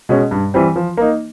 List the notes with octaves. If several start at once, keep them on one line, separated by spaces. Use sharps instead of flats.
B2 G#3 C#4
G2
E3 G3 C4
F3
A#3 D#4